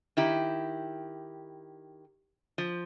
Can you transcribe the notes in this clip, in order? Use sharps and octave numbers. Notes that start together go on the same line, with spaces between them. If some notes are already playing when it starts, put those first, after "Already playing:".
D#3 E4 G4
F3